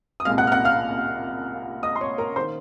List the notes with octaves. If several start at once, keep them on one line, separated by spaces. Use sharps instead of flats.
D#6
C2 A#2 G#3 F5 F6
F#5 F#6
F6
F#5 F#6
F5 F6
D#5 D#6
C6
C#5 C#6
A#4 A#5
D#3 A#3 C5 C6